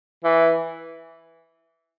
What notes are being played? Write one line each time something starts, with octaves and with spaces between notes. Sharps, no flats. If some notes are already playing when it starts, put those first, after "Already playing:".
E3